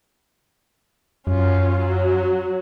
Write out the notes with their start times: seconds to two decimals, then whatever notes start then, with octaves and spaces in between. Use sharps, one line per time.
1.27 F#2 C#4 F4
1.80 F#3